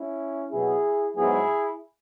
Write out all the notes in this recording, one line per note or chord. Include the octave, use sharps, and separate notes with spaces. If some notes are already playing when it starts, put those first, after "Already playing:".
Already playing: C#4 E4
B2 F#3 B3 E4 G#4
G#2 F#3 B3 E4 G#4